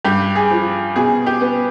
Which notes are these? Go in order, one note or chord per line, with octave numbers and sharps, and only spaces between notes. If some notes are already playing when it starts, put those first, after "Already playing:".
G2 G4
G#4
F3
B2 G#4
G4
B3